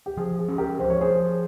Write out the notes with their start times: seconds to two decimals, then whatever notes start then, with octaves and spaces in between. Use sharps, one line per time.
0.06 G4
0.17 F3 G#4
0.39 G#4
0.48 C#4
0.58 G4 A#4
0.79 F3 C5
0.90 C#5
1.01 G#4 C5
1.11 F3